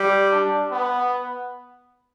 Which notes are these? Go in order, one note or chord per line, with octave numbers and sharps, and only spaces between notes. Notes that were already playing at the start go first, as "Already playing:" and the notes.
Already playing: G3
D4
B3